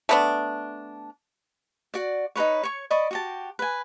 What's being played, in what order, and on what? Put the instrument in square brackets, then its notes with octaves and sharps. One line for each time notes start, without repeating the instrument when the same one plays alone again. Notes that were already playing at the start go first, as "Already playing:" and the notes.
[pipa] A3 B3 D4
[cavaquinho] F#4 D5
D#4 A4 B4 C#5
C#5 C#6
D5 D#5 B5 C#6
F#4 G4 A5
B4 G#5